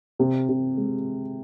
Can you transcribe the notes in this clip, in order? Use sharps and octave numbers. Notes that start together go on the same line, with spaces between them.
C3
C3
G#3